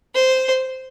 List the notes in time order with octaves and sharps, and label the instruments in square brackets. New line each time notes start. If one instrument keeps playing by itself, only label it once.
[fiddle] C5